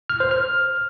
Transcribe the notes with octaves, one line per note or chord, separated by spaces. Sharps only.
F6
C5
F6